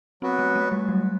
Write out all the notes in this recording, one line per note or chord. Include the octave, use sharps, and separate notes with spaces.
F#3 B3 C4 F#4 B4
A3
A3
G3
F#3